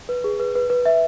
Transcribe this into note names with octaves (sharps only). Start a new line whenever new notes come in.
B4
G#4
B4
B4
B4
E5